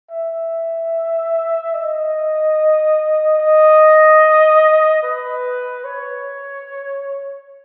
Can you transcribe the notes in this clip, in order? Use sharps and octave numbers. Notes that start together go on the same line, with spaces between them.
E5
D#5
D#5
B4
C#5